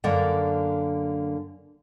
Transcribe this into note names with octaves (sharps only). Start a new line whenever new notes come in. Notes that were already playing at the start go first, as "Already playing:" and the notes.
F#2 D3 A#3 D5 F#5